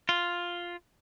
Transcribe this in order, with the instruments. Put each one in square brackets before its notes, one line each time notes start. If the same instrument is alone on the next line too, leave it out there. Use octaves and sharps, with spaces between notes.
[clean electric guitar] F4